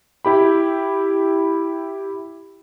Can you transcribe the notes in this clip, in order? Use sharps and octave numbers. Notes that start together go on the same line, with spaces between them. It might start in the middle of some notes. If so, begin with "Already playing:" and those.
E4 G4 B5